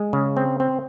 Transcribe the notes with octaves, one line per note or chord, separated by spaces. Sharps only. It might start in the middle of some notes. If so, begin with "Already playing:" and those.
Already playing: G#3
C#3
C4
C4